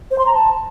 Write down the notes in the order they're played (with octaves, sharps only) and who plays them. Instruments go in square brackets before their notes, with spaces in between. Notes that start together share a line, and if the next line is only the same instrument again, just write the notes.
[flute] C5
C6
A#5
A5